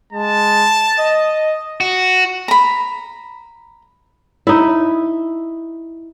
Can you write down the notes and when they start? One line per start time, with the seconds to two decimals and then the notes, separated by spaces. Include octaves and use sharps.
0.13 G#3 A5
0.99 D#5
1.80 F#4
2.48 A#5 B5
4.47 D#4 E4